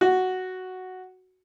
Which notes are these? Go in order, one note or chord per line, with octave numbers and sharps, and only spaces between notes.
F#4